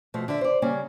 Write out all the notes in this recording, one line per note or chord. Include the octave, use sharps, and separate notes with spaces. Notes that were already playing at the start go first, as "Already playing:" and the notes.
B2 F3 A3
D3 E5
C5 D5
C#3 G3 A#3 C#4